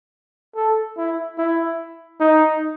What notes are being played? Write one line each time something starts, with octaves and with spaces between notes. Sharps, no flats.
A4
E4
E4
D#4